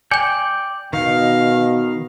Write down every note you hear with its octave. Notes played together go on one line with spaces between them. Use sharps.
D5 G5 G#5 G6
B2 D#3 F5